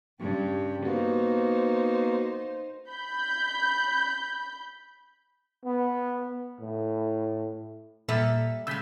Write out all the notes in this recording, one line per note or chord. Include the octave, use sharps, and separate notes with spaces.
G2 C#3 G5
A#3 B3 D#4 F#4 C5
B5 G6
B3
A2
A#2 G3 A4 E5
C#3 G#3 E6 G6 B6